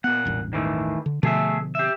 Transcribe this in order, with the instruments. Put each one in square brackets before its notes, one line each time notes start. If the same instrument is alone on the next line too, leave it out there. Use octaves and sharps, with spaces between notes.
[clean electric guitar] A#2 F#5 [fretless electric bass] B3
[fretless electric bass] E1 A1 G2
[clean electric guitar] D#3 E3 A3
[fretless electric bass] D3
[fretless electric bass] B2 D3 F3 [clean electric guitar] A3 G#4 E5
[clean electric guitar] G4 E5